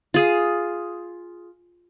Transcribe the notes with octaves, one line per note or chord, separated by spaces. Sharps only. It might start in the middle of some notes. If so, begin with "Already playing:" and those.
F4 G#4